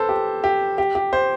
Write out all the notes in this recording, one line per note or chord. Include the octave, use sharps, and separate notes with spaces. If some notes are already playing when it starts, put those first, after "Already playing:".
Already playing: A4 B4 C5
G4
G4
G4
G4
C5